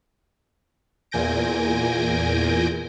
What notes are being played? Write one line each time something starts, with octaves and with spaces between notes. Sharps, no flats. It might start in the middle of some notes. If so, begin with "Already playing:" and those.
E2 A#2 G#5 G6 A#6 D7